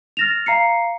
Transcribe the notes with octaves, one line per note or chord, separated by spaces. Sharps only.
F6 A6 A#6 E7 F7
F5 A#5 C7 C#7